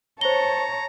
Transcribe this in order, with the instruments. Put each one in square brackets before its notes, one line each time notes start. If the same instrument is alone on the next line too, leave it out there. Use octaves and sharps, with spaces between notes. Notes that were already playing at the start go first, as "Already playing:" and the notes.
[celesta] C5 G7 [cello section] C#5 [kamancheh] A5 [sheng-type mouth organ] A#5